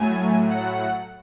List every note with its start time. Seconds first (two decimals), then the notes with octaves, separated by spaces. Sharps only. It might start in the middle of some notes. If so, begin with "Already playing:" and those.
Already playing: A2 F#3 A3 G#5
0.49 F#5